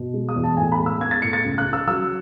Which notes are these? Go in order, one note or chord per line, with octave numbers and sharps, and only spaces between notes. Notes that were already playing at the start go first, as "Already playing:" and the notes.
Already playing: B2
G#3
D#6
E2
A5
A2 G#5
B5
G#3
E6
B3 G#6
A6
A2 C#7
A6
C#2
F#6
C#3
E6
F#3 E6